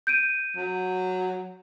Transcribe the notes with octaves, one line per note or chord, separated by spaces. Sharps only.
G6 D7 D#7
F#3